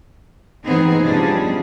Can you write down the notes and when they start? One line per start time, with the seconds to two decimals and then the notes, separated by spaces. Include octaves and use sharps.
0.66 E3 B3 C4 D#4 G#4 C5
1.04 B2 F3 G3 C#4 D4 G#4